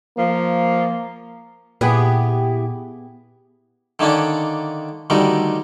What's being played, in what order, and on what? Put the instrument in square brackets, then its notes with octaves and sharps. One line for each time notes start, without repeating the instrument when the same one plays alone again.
[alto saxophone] F3 [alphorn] A#3
[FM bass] A#2 [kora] B3 G#4 B4 [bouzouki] E4 G4
[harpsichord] D3 D#3 A#3 C#4 D4
D2 D3 D#3 G3 A#4